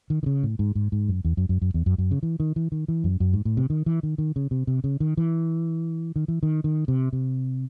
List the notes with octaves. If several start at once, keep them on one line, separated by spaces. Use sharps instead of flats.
D#3
D#3
C#3
A2
G#2
G#2
G#2
F#2
E2
F#2
F#2
F#2
E2
F#2
F#2
C#3
E3
D#3
E3
D#3
E3
F#2
F#2
G#2
A2
C3
D#3
E3
D#3
D#3
C#3
C3
C3
C#3
D#3
E3
D#3
E3
D#3
D#3
C3
C3